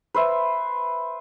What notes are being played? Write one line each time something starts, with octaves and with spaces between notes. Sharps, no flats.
B4 C5 E5